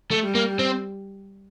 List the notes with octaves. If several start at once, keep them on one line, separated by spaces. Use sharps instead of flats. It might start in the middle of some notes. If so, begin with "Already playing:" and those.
A3
G3
A#3
C4